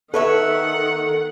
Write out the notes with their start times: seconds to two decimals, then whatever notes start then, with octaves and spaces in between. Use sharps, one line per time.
0.14 D#3 A4 B4 C#5 E5 F#5